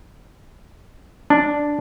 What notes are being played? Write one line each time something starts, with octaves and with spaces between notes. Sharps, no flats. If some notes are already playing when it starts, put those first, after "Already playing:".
D4